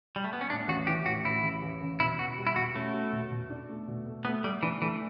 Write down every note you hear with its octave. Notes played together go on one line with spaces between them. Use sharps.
G3
A3
B3
C#4
A2 D4
A1 F#4
E3 G4
A2 F#4
A1 E4
A1
A1
A1
B2 E4
B2 F#4
G3
E4
B2 F#4
A3 C#4
F#4
B2
B2
D4
A3
B2
A3
A3 B3
G3 A3
E3 D4
E3 A3